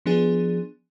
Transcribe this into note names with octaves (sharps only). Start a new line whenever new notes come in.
F3 B3 D4 G#4